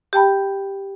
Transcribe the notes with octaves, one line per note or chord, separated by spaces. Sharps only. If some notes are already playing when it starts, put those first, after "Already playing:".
G4 G5 A5 B5